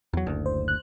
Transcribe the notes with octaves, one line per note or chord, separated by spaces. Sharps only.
E2 F#3
F#1 D2
C5
F#6